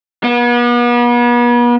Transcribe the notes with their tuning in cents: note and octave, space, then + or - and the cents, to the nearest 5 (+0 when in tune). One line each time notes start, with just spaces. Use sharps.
B3 -40